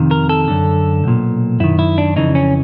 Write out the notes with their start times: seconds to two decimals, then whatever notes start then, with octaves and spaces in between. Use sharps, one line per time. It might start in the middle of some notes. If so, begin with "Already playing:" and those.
Already playing: F2 C3 D#3
0.11 A#4
0.29 A4
0.48 F#2 D3
1.04 B1 A#2
1.60 F#2 D#3 E4
1.79 E4
1.98 D4
2.16 F2 C#3 E3 D#4
2.35 C#4